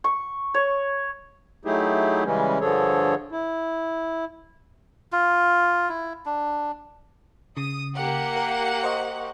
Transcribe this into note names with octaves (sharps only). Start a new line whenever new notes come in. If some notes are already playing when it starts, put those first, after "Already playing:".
C#6
C#5
F#3 A3 D#4 E4 G4 G#4
C#3 E3 G3 G#3 C#4
G2 D3 F3 G#4 A4 C#5
E4
F4
E4
D4
C#3 D#6
A#3 G4 F#5
A#4
C5 D#5 C#6